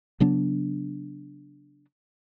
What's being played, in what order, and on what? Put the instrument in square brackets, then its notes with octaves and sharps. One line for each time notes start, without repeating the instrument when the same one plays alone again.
[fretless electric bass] C#3 F#3 B3 D4